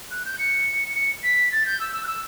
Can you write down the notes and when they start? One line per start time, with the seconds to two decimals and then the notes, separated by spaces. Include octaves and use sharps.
0.10 F#6
0.25 G6
0.38 C#7
0.95 C#7
1.23 B6
1.52 A6
1.66 G6
1.80 E6
1.93 E6
2.04 F#6
2.07 E6